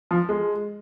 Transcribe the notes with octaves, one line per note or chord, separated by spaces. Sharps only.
F3
G#3